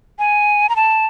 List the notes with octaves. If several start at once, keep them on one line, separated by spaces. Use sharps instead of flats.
G#5
A#5
A5